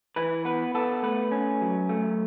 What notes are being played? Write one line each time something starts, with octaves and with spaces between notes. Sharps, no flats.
E3 B4
B3 B4
B3 A4
A3 B4
C#4
F#3
A3